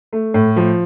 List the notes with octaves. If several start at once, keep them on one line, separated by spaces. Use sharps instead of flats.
A3
A2
F3